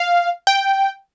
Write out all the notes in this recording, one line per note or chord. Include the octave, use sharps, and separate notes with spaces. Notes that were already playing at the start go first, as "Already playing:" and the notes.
Already playing: F5
G5